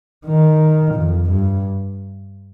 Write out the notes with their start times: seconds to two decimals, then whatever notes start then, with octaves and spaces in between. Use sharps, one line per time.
0.26 D#3
0.94 F2
1.29 G2